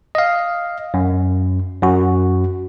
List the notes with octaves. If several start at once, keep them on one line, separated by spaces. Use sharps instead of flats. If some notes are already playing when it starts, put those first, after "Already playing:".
D#5 F5
F#2
F#2 F#4